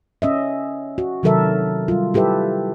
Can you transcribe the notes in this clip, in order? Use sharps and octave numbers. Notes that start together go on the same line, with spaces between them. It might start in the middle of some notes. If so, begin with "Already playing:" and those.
C#4 D#5 E5
F#4
C3 D#3 F#3 A4 A#4 E5
G3 F4
E4 G4 A4 B4 E5